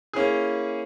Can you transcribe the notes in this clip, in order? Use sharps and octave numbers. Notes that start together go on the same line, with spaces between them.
A#3 C#4 E4 G#4